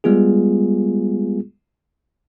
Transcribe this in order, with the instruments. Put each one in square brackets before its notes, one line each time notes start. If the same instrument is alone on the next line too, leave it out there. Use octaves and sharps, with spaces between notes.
[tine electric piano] G3 G#3 B3 F4 G#4